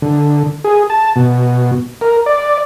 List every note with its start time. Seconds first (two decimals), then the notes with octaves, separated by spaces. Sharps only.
0.02 D3
0.64 G#4
0.90 A5
1.16 B2
2.01 A#4
2.26 D5